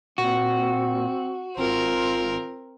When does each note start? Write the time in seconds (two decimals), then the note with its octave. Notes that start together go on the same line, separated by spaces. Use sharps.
0.18 A#2 C4 F#4
1.57 G#1 C4 F4 A#4